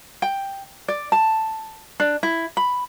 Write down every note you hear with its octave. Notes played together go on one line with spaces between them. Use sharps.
G5
D5
A5
D4
E4
B5